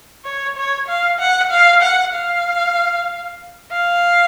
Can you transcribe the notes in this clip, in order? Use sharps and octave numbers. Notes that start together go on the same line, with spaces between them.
C#5
C#5
F5
F#5
F5
F#5
F5
F5